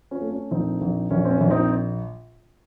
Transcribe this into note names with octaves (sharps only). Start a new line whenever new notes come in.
C#4 F4
A3
C#4
A#1 C4 D#4
A#1
A#1 C#4
C4
C#4
A#1
C4 D#4